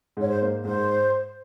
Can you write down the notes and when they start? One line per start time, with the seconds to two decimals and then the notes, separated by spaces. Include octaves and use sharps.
0.17 G#2
0.22 C#5
0.28 C5
0.42 A#3
0.64 G#2 C5